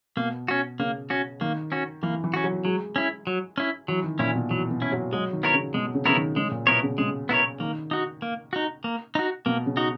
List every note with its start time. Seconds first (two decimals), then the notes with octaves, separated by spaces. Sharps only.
0.17 B2 A#3
0.48 C#4 F#4
0.79 C#3 A#3
1.10 C#4 F#4
1.41 D#3 A#3
1.72 C#4 F#4
2.03 E3 A#3
2.24 E3
2.34 C#4 F#4
2.44 F#3
2.65 F#3 G#3
2.96 C#4 E4
3.27 F#3
3.58 C#4 E4
3.88 E3 F#3
4.04 D#3
4.19 A#2 C#4 E4
4.35 B2
4.50 E3 F#3
4.71 B2
4.82 C#4 E4
4.92 F#3
5.13 F#3 G#3
5.33 D#3
5.43 B3 E4 A#4 C#5
5.54 C#3
5.74 B2 G#3
5.95 C#3
6.05 C#3 B3 E4 A#4 C#5
6.16 D#3
6.36 C#3 G#3
6.51 A#2
6.67 B2 B3 E4 A#4 C#5
6.83 C#3
6.98 C#3 G#3
7.29 B3 E4 A#4 C#5
7.60 D#3 A#3
7.91 D#4 F#4
8.22 A#3
8.53 D#4 F#4
8.84 A#3
9.15 D#4 F#4
9.46 B2 A#3
9.66 C#3
9.77 D#4 F#4